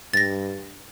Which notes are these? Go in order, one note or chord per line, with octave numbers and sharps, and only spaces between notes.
G2 A6 A#6